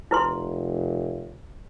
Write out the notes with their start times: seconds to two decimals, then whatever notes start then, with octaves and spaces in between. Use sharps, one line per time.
0.11 F1 E4 B4 C6